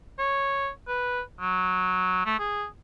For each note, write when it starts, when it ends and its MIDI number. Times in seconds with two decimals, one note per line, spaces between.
0.19 0.69 73
0.88 1.21 71
1.40 2.25 54
2.26 2.36 57
2.39 2.66 68